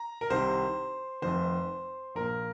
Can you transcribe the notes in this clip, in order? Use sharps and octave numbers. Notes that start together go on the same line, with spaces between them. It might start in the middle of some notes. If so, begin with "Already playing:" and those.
Already playing: A#5
A#4
C2 C3 D#3 C5
F1 F2 D#3 C5
A#1 A#2 A#4